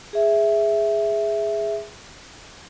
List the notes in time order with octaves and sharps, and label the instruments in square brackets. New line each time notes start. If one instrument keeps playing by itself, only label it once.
[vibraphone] G#4 E5